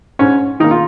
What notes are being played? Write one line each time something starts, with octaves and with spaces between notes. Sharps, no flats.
G#2 C#4
D#3 A#3 D#4
F4